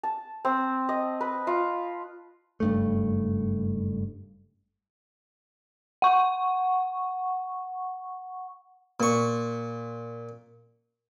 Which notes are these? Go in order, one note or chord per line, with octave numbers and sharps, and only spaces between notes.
A5
C4
D#5
B4
F4
F#1 G2 A3
F#5 C#6
A#2 C#6